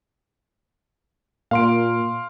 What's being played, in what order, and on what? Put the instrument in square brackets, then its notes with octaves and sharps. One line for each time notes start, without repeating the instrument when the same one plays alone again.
[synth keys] A#2 [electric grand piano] F5 C6 D7